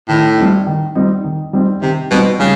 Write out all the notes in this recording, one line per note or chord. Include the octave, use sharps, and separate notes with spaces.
A2 D#3
G3 C4 D#4
D#3
G3 C4 D#4
D#3
G3 C4 D#4
C3 D#3
B2 G3 C4 D#4
C#3 G3